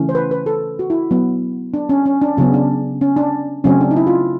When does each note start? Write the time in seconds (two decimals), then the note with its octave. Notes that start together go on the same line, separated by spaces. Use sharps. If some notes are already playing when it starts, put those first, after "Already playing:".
Already playing: C#3 E3 A3 C#4
0.09 C5
0.15 B4
0.31 B4
0.46 A4
0.79 F#4
0.90 E4
1.11 F#3 B3
1.74 D4
1.89 C#4
2.06 C#4
2.21 D4
2.37 C#3 F#3 B3 C#4
2.54 D4
3.01 C#4
3.17 D4
3.64 C#3 F#3 A3 C4 C#4
3.81 D4
3.91 D#4
3.96 E4
4.07 F4